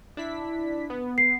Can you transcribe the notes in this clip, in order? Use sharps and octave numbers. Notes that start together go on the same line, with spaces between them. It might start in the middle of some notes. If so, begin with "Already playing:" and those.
D4 E4 B6
B3
C7